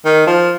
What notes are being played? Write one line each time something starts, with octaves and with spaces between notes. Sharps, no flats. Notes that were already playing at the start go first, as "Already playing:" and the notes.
D#3
F3